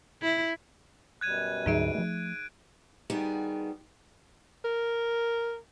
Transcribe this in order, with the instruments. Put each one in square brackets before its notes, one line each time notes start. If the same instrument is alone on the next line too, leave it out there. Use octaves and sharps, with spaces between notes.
[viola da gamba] E4
[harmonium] F#2 B2 G3 [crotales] F#6 G#6 D#7
[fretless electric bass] D2 G#2 F#3 [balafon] D#4 G#4 E5 [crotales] G#6 D7
[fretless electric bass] F3 A3
[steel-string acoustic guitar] D#3 G3 B3 F#4 G#4
[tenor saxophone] A#4